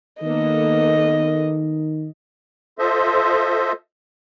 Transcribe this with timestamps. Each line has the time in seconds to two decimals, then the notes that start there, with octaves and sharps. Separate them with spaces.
0.22 D#3 A#3 B3 A4 D#5
2.79 F4 A4 C5 D#5 E5